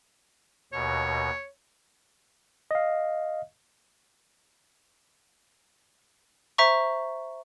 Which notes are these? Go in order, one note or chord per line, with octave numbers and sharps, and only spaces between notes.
D#2 B2 C#5
D#5 F5
C5 E5 A#5 C#6